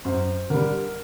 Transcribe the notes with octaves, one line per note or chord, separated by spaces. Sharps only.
F#2 C5
D3 G3 A#4